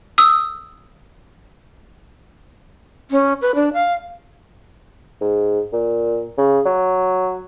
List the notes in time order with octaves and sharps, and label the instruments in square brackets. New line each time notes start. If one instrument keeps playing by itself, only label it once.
[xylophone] D#6 E6
[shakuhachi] C#4
B4
D4
F5
[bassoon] G#2
A#2
C#3
F#3